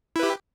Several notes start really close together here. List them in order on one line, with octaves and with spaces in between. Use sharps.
E4 B4 G4